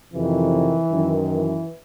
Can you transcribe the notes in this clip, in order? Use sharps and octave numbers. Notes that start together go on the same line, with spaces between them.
F2 C3 D#3 E3
F#2 D#3
E3